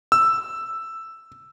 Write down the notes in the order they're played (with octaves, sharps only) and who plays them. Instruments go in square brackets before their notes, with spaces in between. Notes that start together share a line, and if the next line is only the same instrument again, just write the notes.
[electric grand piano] E6